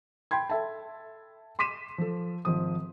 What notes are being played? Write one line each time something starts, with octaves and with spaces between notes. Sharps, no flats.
G5 B5 C6 G#6
A4 E5 A5
C6 D6 B6 D#7 E7
F3 A4
G#1 F3 D#6